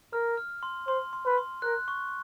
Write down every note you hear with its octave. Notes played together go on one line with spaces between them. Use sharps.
A#4 F6
F6
C6
C5 C6
C6
B4
C6
A#4 F#6
C#6